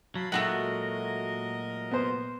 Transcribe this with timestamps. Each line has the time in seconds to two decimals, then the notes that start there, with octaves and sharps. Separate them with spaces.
0.15 F#3 F5 A5 B5
0.32 A#2 F#3 G#3 A3 E4 F#4 A#4 D#5
1.91 B3 C5